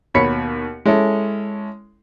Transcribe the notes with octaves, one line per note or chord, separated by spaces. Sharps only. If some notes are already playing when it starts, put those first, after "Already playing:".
D#2 B2 C#5 B5 B6 C#7
G#3 C#4 E4 A4